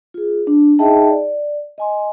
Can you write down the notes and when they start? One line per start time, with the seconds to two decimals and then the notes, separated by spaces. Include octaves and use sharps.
0.14 F4 G#4
0.47 D4
0.79 D#4 G#4 D#5 E5 G5 A5
1.10 D5
1.78 D#5 G#5 C6